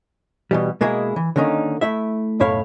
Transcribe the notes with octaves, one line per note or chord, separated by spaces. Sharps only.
B2 E3 G3
B2 G#3 A#3 E4 G#4
E3
D3 D#3 A#3 C#4 D#4
A3 E4 E5
B1 F#2 A2 E4 C#5 F5